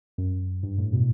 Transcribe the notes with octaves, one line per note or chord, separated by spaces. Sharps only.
F#2
G2
A2
B2